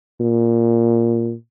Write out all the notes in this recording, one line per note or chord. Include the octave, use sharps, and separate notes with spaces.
A#2